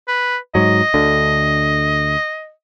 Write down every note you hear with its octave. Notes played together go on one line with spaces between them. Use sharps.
B4
G#2 F#3 D#5
D2 D3